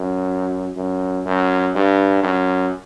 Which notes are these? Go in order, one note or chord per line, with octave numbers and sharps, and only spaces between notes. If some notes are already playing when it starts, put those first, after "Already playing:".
Already playing: F#2
F#2
F#2
G2
F#2